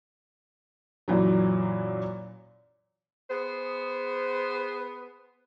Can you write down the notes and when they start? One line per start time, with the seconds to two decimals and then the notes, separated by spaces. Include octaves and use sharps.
1.08 F#2 A#2 E3 F#3
3.30 B3 G#4 C5